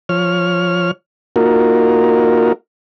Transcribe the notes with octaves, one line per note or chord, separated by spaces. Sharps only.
F3 C#5 F6
A#3 D#4 F4 F#4 A#4